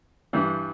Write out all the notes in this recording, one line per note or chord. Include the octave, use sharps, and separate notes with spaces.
G2 E3 G3